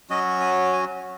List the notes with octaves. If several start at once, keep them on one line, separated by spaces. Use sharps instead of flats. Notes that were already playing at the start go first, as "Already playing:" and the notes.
F#3 C#4 F#4 D#5
G#5
G#5